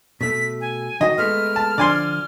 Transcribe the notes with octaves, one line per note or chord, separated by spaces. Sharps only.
B2 A3 B6
G#5
D#3 F#4 D#5
G#3 A3 B3 F6
A5
D3 F3 D5 G#5 C6